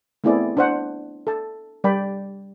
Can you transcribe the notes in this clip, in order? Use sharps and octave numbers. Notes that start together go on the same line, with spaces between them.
A3 B3 C4 E4 G#4 D5
D4 C5 F#5
A4 A5
G3 D5 G5 B5